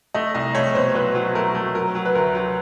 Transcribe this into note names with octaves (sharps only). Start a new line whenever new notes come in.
A3 D#5
C2 D#5
A3 C#5
B2 C5
F#3 B4
F#3
A3 A#4
A3
F#3 A#4
F#3
B4
D2 A#4
F#3